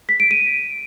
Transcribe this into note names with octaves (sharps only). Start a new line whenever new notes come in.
B6
D7
D#7